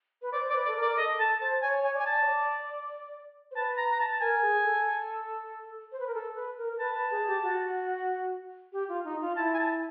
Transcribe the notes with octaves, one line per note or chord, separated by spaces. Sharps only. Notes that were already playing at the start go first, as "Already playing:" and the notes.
B4
C5 D5
C5
D5
B4
A4 D5
A#4
D5
A4 D#5
A4 A5
C5 A5
C#5 G#5
C#5 G#5
D5 G#5
A5
C#5
D5
C5
B4 A5
A#5
A#5
A5
A5
A#4 G#5
G#4
A4
C5
B4
A#4
A4
B4
A#4
A#4
B4 A5
B4
G#4
G4
F#4
G4
F4
D#4
F4
E4 A5
G#5
A5